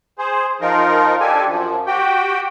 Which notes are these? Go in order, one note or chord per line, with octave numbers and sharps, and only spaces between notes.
G#4 C5
F3 D#4 F4 A#4
D4 G4 A4 G#5
F#2 F3
F#4 G4 G5